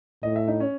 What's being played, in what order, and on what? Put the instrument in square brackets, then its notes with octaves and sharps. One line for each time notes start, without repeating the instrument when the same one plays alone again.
[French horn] A2 [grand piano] D#5
[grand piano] E5
D#4 D#5
C#4 C#5